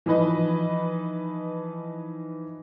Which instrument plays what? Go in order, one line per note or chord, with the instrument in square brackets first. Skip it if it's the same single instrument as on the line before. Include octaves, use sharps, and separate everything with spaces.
[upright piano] E3 F3 D#4 B4 D#5